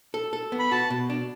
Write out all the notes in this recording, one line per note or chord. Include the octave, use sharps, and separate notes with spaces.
A4
A4
B3
B5
F#4 A5
B2
D4